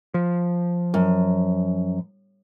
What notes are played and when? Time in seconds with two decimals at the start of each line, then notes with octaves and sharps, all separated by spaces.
0.14 F3
0.94 F#2